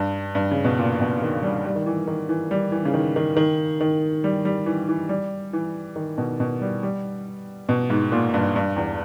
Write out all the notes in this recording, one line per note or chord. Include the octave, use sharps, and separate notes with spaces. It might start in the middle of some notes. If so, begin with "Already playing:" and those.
Already playing: G2
G2
C#3
B2
A#2
B2
D#3
G3
G3
D#3
E3
D#3
E3
G3
E3
C#3
D#3
D#3
D#3
D#3
G3
G3
E3
E3
G3
E3
D#3
B2
B2
G3
G3
B2
G#2
A#2
G2
G2
E2